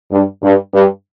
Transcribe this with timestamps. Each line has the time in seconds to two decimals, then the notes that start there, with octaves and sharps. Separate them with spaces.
0.11 G2
0.42 G2
0.74 G2